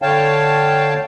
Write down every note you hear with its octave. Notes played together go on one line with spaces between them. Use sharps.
D3 C#5 F5 G5 A5